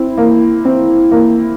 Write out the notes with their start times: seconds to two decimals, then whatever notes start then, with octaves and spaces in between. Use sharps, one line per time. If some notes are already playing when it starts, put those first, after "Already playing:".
Already playing: C4 E4
0.17 A#3
0.65 C4
1.11 A#3